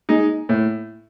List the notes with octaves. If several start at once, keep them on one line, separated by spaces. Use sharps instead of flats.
G#3 D#4
A2